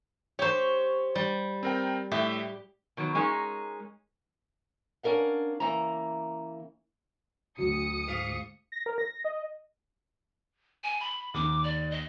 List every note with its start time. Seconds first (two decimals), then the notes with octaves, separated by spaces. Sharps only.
0.39 G4 C5 C#5 C#6
1.15 G3
1.63 C4 A#4 G5
2.11 A2 G4 E5
2.97 B2 D#3 F#3
3.15 G#3 C#4 D#4 A#4
5.03 C#4 D4 A#4 F5 F#5
5.60 C#3 E3 A#3 A#5
7.58 D2 F#3 D#6 C#7
8.08 G#2 F4
8.72 A#6
8.86 A#4
8.98 A#6
9.25 D#5
10.84 G#5
11.00 B5
11.34 D#2 D#3 D6
11.64 D5
11.91 D#5